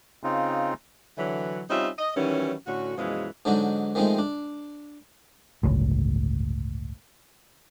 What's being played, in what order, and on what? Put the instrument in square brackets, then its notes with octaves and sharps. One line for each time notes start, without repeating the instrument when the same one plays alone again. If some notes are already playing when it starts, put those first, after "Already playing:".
[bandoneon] C#3 C4 D#4 F4
[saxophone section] D3 E3 F#3
G3 C4 C#4 D#4 F4 E5
D#5
D#3 E3 F#3 G3 C#4
A2 D3 C#4 F#4
F#2 B2 E3 F3 G#3
[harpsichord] G#2 D3 F#3 D4 D#4
D#3 F3 G#3 A3 C4 D#4
D4
[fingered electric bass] G1 C#2 A2